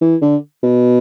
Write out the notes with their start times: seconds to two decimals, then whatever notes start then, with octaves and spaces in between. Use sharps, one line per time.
0.01 E3
0.22 D3
0.63 B2